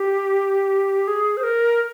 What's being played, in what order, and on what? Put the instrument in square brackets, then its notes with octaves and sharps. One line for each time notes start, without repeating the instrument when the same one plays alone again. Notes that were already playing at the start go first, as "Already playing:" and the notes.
Already playing: [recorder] G4
G#4
C5
A#4